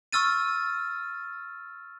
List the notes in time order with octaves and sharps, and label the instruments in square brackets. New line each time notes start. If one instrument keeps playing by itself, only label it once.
[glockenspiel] C#6 E6 F6 A6 D#7